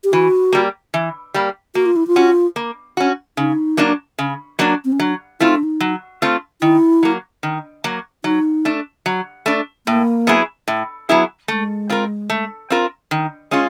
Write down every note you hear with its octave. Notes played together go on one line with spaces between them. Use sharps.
G4
E3 F#4
G3 A#3
E3
G3 A#3
A#3 F#4
F4
E4
F4
C#4 F#4
A#3
C#4 F#4
C#3 D#4
F#3 A#3 D4
C#3
F#3 A#3 D4
C4
C#4
F#3 D4
A3 C4 E4 F4
D#4
D4
D#4
F#3
A3 C4 F4
D#3 E4
F#3 A#3
D#3
F#3 A#3
F#3 D#4
A3 D4
F#3
A3 D4
A2 A#3
F#3 B3 E4 G#4
A2
F#3 B3 E4 G#4
G#3 A3
C4 F4 A#4
A3
C4 F4 A#4
D#3
G#3 C#4 F4